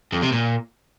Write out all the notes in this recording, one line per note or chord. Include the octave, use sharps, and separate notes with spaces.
F2
C3
A#2